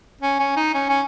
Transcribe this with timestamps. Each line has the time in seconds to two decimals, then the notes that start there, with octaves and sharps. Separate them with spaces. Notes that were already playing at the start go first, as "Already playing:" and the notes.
0.21 C#4
0.39 C#4
0.56 D#4
0.74 C#4
0.89 C#4